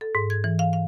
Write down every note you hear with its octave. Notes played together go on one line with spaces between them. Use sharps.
A4
G#2
G#6
E3
F5
F5